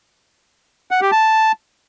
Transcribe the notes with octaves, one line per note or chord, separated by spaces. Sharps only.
F#5
G4
A5